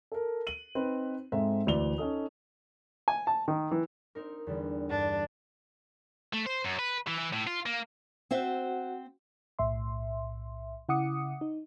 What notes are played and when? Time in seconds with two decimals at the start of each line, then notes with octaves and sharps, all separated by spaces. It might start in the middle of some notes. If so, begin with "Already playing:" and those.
0.12 A4 A#4
0.47 D#7 F#7
0.75 C4 D#4 B4
1.32 G#2 C4 A4 E5
1.67 D2 E3 D5 F7 G7
1.98 C#4 D#4 A4 D#6
3.08 G#5
3.27 A5
3.48 D#3
3.71 E3
4.15 C4 D#4 A#4
4.47 E2 D3 G3
4.90 G2 D4
6.34 A3
6.47 C5
6.65 F#2
6.79 B4
7.07 E3
7.19 E3
7.32 A2
7.47 F4
7.66 A#3
8.31 C4 F#4 C5 E5 F#5
9.59 B1 A2 E5 C6
10.89 C#3 E4 F#5 D6 D#6 C#7
11.41 D#4